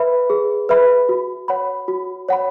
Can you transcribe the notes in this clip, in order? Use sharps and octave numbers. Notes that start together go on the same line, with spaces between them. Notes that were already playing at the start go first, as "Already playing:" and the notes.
Already playing: B4 E5 B5
G#4
B4 E5 B5
F#4
C#5 F#5 B5
F#4
C#5 F#5 B5